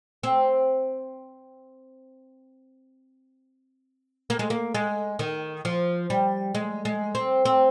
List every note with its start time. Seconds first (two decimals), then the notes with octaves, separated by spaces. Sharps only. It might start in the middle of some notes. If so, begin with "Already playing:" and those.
0.23 C4
4.30 A#3
4.39 G#3
4.50 A#3
4.74 G#3
5.19 D#3
5.65 F3
6.10 G3
6.55 G#3
6.85 G#3
7.15 C4
7.45 C4